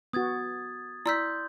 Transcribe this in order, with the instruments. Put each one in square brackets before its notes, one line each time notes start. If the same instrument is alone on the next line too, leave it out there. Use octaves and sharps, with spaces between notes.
[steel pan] B3 F#4 [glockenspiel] D#6 G#6 A6
[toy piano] E4 [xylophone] D5 E6 B6 [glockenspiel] C6 G6